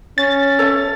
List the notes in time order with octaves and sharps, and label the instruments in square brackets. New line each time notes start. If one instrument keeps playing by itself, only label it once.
[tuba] C#4 [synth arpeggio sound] A6
[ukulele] A4 C#5 E5